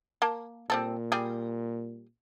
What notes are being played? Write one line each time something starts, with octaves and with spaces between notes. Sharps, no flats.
A#3 A5
A#2 G3 C4 A4
G3 G#4